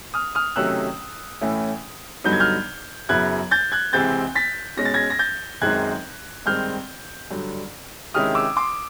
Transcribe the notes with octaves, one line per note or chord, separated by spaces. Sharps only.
D#6 F6
D#6 F6
C3 D#3 F#3 A3 C#4 E6 F#6
A2 E3 A3 C#4 E4
G2 D3 F#3 B3 D#4 G6
G#6
F6 G6
F#2 C#3 F#3 B3 E4 F#6 G#6
G6 A6
F#6 G#6
C#2 C3 E3 G#3 C4 G6 A6
A6 B6
B2 G#3 C#4 A#6
A6
G#6 A#6
A#6
G6 A6
F#2 D#3 G#3 C4 D#4 F#6 G#6
G2 D#3 G#3 C4 F6 G6
G2 D3 F#3
C3 D#3 G#3 C#4 E4 D#6 F6
D6 E6
C6 D6